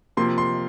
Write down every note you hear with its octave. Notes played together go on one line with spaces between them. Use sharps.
C3 F3 A#3 C6
C6